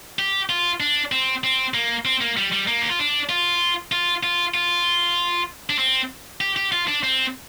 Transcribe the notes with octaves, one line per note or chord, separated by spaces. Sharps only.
G4
F4
D4
C4
C4
A#3
C4
A#3
G3
G3
A#3
G4
F4
D4
F4
F4
F4
F4
D4
C4
G4
G4
F4
D4
C4